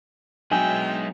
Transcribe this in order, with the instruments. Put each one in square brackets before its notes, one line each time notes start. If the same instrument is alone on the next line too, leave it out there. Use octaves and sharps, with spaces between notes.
[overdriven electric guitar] F#3 B3 [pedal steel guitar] G#3 D#4 E5 [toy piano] D4 [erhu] G5